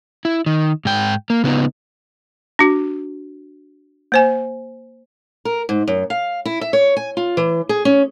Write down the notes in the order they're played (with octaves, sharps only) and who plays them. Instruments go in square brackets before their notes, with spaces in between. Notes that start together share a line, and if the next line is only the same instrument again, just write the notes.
[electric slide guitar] E4
D#3
G#2 G5
A#3
C#3 B3 D#4
[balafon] D4 F#4
A#3 C5 G#5
[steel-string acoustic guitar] A#4
G#2
F#2
F5
E4
E5
C#5
G#5
F4
E3
G#4
C#4